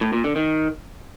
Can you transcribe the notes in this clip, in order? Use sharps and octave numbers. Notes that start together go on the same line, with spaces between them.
A2
A#2
D3
D#3